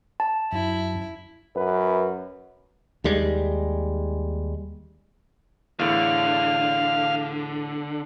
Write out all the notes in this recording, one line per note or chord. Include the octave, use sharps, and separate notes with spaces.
A5
F#2 E4
F#2 B4
D#2 G3 G#3
E2 A2 D3 F5